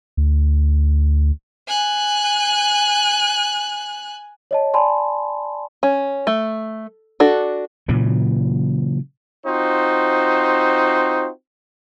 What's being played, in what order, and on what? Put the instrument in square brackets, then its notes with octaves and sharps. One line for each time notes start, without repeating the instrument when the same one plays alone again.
[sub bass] D2
[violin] G#5 F#6
[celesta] C#5 D#5 A5
D5 G#5 A5 B5 C6
[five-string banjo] C#4
A3
D4 F#4 A4
[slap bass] A#2 C#3 E3 F#3
[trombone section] C4 D#4 F4 F#4 C5